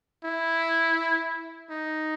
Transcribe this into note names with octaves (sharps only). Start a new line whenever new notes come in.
E4
D#4